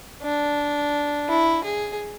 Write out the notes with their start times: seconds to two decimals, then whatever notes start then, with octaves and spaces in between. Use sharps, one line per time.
0.23 D4
1.28 E4
1.64 G#4